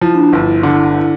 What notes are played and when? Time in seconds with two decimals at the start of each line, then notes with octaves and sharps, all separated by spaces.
0.01 F3 E4
0.14 D4
0.28 G1 E4
0.63 D3